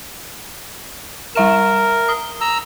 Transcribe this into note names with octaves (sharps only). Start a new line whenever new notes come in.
G3 A#4 E5 E7
D#6 G7
A#5 E6